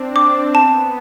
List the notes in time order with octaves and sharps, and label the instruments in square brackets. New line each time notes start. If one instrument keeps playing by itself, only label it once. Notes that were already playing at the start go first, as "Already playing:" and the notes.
Already playing: [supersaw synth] C4 D4
[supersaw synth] C4 [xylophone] D6
[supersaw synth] B3 [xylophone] A5